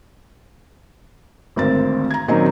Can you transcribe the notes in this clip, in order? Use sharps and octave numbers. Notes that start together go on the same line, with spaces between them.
G#1 D2 C4 A#4 A6
A#5 G#6
A#2 D#3 F#3 C4 C#4 D#4